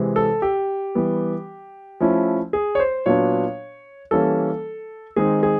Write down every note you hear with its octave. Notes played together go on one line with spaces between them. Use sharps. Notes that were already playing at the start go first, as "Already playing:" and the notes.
Already playing: C3 E3 G#3
A4
G4
E3 G3 B3
F3 A3 C#4 E4
G#4
C#5
C5
A#2 F#3 B3 D4 C#5
E3 G3 A#3 C#4 A4
D#3 G#3 C4 D#4 G#4
G#4